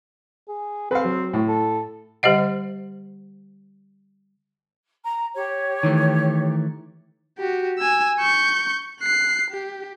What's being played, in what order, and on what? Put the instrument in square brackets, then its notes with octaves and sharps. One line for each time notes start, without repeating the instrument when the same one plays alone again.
[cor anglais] G#4
[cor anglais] C4 [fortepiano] B4 F5
[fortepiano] F#3
A2
[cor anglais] A4
[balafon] D3 G3 G4 C5 D#5 F#5
[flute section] A#5
G4 C#5
[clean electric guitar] D#3 E3 A3
[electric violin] F#4 G4
G#5 E6
C#6 G6
F#6 C7
G4